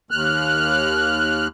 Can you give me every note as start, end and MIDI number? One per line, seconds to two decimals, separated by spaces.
0.11 1.48 39
0.11 1.48 89
0.11 1.48 90